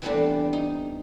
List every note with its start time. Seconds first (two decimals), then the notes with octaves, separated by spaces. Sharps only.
0.02 E3 G3 A3 B3 C4 D4
0.53 D#4